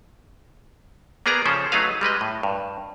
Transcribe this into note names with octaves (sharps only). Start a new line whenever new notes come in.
A#3 B3 G#4 D5 A#5
C#3 F3 C#4 A4 C5
F#3 A3 D#4 G#4 B4 F5
G3 G#3 B4 D#5
A2
G2